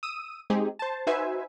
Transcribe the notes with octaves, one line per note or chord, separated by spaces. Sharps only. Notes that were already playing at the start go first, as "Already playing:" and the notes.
D#6 E6 D#7
G#3 C4 D#4 G4 G#4
C5 A5
D#4 F#4 B4 C5 E5 G#5